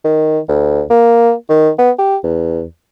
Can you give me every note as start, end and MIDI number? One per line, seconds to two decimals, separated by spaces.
0.04 0.39 51
0.48 0.82 38
0.90 1.32 58
1.49 1.70 51
1.78 1.91 59
1.98 2.16 67
2.23 2.64 40